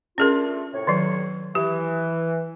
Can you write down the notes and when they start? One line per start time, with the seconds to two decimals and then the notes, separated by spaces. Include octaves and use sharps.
0.18 A3 C#4 D4 F4 G#4 A#4
0.73 A2 C3 C#5
0.87 D#3 F#3
1.55 E3 G4